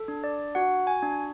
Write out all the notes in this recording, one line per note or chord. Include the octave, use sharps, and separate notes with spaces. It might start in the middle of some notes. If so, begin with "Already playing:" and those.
Already playing: A4
D4
D5
F#4 F#5
G#5
D4